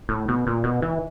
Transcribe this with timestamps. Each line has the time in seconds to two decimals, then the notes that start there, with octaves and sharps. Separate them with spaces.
0.09 A2
0.28 B2
0.47 A#2
0.64 B2
0.82 E3